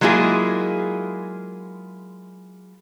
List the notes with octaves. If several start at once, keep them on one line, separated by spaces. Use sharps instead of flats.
F#3 G#3 A#3 E4 F4 G#4